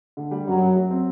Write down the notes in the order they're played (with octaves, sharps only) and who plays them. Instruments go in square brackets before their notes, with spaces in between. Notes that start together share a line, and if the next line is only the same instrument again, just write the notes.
[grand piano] D3
G3
[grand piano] F#2 [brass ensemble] F#3
[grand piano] F#2
F#3
C4